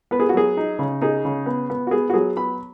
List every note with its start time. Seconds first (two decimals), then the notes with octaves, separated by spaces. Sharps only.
0.11 B3 B4
0.20 G#4
0.29 F#4
0.34 F#3 G#4
0.57 D#4
0.79 C#3
1.02 D#4 G#4
1.25 C#3
1.46 B3
1.70 B3
1.87 F#4
1.91 B3 G#4
2.10 F#4
2.14 F#3 G#4
2.36 B3 B5